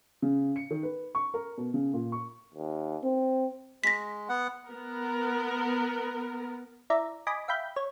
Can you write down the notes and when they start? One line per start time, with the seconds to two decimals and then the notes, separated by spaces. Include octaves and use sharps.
0.22 C#3
0.56 C#7
0.71 D#3
0.83 B4
1.15 C#6
1.34 A#4
1.58 B2
1.74 C#3
1.93 A#2
2.12 C#6
2.55 D#2
3.03 C4
3.84 G#3 A#6 B6
4.29 B3 F#5
4.68 B3 A#4
6.90 E4 D5 E5 A#5
7.27 D#5 G#5 B5 D6
7.48 E5 F5 G5 B5 G6
7.76 C#5